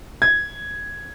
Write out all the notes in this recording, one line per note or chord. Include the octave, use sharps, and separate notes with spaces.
G#6